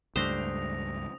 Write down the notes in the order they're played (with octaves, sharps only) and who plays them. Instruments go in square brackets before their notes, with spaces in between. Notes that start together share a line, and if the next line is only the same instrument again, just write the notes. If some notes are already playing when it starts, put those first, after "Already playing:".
[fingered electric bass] C#2 G2 [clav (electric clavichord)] A3 D4 G4 [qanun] C5 [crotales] D#6 A#6